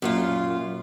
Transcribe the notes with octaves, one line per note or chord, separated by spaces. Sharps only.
F#2 A#2 F4